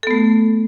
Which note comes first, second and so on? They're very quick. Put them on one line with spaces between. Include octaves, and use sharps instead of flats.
A4 B3 A3